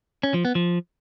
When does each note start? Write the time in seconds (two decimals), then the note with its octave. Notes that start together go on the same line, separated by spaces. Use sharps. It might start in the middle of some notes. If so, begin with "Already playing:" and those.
0.23 C#4
0.34 F3
0.45 B3
0.55 F3